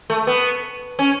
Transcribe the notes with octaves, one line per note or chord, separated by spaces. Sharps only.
A3
B3
C#4